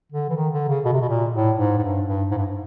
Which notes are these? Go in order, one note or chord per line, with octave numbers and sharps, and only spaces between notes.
D3
E3
D#3
D3
C#3
B2
C3
B2
A#2
A2
G#2
G#2
G2
G2
G#2
G2